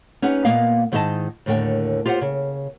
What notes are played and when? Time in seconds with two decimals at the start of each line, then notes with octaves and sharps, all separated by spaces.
0.22 C#4 D#4 G4 B4 F#5
0.45 A#2 A#3 B3 D#5 F5
0.92 G#2 D#3 E4 G4 D#5 A5
1.46 D#2 A2 D3 A#4 G5
2.06 F4 G4 C5 D5 F#5
2.21 C#3